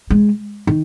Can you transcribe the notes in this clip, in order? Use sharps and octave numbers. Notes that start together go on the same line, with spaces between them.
G#3
D#3